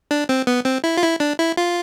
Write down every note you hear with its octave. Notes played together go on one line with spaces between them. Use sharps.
D4
C4
B3
C4
E4
F4
E4
D4
E4
F4